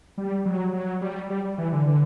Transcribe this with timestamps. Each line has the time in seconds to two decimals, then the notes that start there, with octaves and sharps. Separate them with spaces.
0.18 G3
0.46 F#3
0.73 F#3
1.01 G3
1.30 G3
1.58 E3
1.73 D3
1.87 D3